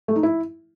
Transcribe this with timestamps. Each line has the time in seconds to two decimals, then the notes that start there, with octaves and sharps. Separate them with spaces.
0.08 A3
0.16 D#4
0.23 E4